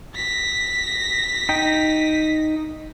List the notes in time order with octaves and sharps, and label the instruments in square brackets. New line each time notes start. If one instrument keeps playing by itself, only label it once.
[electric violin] A#6 B6
[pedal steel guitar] D#4 G5